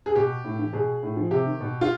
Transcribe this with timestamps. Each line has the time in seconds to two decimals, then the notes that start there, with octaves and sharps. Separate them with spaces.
0.06 G#4
0.15 B2 G4
0.44 A2
0.59 E3
0.73 B2 G#4
1.02 A2
1.17 F3
1.31 C3 G4
1.46 D#3
1.60 B2
1.81 F4